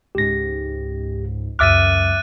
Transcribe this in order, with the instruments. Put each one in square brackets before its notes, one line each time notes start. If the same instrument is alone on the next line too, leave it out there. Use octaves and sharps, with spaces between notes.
[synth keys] C#2 G#2 [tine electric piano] G4 A#6
[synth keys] C#2 F#2 [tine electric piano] E5 D6 F6 [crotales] F#6 A6 D#7